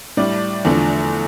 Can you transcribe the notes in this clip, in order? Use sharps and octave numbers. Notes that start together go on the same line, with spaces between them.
A2 G3 D5
E2 D3 F3 A3